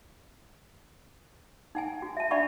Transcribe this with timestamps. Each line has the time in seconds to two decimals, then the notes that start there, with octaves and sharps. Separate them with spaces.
1.75 D#4 F#5 G#5
2.02 F#4
2.17 E5 A5
2.31 D4 D5 E5 F#5 B5 C#6